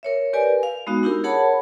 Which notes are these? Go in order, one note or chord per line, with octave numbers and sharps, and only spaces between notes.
A#4 C#5 E5
G4 A#4 B4 D5 G#5
F5
G#3 B3 D#4 F#4
D4 E4 G4 A#4
G#4 A#4 C#5 F#5 A5 B5